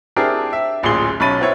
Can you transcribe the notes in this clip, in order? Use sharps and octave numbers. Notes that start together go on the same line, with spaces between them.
C4 D4 E4 G4 G#4 A#4
E5
D1 A1 A#2 G#4 C6 G7
B1 C#4 B5 A6 D#7
B3 C4 E4 C#5